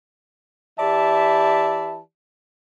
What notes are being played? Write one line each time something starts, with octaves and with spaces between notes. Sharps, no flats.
E3 G4 D5 E5 A5 B5